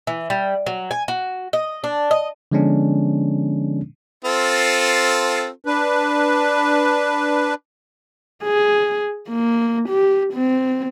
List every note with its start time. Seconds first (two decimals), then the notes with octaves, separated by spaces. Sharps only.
0.07 E3
0.30 G3
0.66 F#3
0.91 G#5
1.08 F#4
1.53 D#5
1.84 D4
2.11 D#5
2.52 D3 F3 G#3 B3 C#4 D4
4.24 C4 F4 A4
5.65 D4 B4
8.43 G#4
9.29 A#3
9.89 G4
10.34 C4